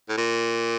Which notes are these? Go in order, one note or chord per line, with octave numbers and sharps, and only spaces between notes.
A2
A#2